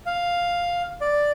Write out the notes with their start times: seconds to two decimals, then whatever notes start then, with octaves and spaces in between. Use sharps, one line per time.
0.06 F5
1.01 D5